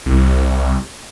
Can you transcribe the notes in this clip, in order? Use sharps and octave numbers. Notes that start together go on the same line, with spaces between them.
C2